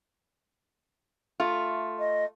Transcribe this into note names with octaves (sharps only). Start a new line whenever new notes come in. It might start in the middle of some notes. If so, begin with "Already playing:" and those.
A3 F4
D#5